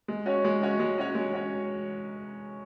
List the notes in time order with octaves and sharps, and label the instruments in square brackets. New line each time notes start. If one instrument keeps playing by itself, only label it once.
[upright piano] G#3
C#4 F#4 C#5
G#3
C#4 F#4 C#5
G#3
C#4 F#4 C#5
G#3
C#4 F#4 C#5